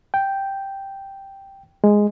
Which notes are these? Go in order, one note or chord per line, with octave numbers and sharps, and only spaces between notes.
G5
G#3